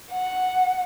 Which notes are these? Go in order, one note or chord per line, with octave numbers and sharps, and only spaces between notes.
F#5